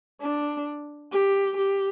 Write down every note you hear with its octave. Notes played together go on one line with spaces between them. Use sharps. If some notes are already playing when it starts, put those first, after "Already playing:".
D4
G4
G4